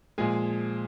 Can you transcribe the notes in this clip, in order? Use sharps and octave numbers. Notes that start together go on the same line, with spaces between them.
A#2 F3 G#3 G#4